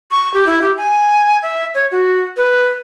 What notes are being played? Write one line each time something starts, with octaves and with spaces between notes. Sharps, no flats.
C#6
G4
E4
G4
G#5
E5
C#5
F#4
B4